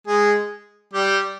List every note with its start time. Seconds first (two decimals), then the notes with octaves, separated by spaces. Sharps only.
0.07 G#3 G#4
0.94 G3 G4